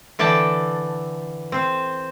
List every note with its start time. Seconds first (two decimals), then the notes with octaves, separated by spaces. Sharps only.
0.19 D3 E3 D5 G5 A5
1.52 C4 C5